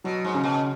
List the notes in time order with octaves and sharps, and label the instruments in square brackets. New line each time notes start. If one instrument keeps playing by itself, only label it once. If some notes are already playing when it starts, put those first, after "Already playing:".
[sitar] B2 [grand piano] F#3
[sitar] G#2
[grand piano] C#3
[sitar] B2